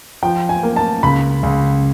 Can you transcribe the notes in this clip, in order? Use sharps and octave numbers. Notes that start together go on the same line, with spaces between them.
F3 G5
G#5
A#3
A5
C#2 B5
C#2